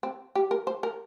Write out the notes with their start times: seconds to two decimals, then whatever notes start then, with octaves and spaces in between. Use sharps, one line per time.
0.03 C4
0.35 G4
0.51 A#4
0.67 C5
0.83 A#4